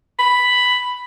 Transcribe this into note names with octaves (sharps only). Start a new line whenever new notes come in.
B5